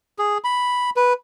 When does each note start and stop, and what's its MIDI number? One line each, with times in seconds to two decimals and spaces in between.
0.19 0.38 68
0.44 0.90 83
0.96 1.13 71